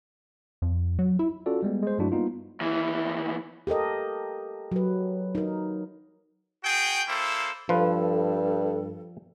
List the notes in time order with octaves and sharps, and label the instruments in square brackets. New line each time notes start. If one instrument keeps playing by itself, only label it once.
[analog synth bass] F2
F#3
E4
[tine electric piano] C#4 F4 F#4 A4 D5
G3 G#3 B3
G#3 C5
G2 F#3 A3 D4 E4 F#4
G3 A#3 B3 D#4 F4
[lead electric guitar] D#2 E3
[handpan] G4 A4 A#4 D#5
F#3 B4
D#4 A#4
[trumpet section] F#4 G#4 G5
A#3 E4 A4 C5
[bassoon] G2 [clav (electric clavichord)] F3 F4 B4 [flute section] A4